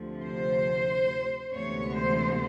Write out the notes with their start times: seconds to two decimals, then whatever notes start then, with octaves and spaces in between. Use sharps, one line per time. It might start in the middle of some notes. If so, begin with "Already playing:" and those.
Already playing: D2 C3 F3
0.23 C5
1.53 D2 C3 E3 G#3 B3 C#5
1.96 C5